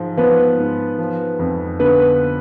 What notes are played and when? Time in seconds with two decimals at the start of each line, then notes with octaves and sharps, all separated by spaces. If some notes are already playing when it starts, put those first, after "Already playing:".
Already playing: G#2 F3
0.17 F3 B3 B4
0.58 G#2
0.98 F3
1.39 F2
1.79 D3 B3 B4